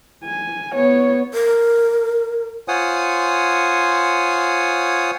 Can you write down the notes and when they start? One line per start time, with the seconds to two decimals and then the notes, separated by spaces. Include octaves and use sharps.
0.25 G#5
0.75 B3 C#5
1.34 A#4
2.68 F4 C5 C#5 F#5 G#5 D#6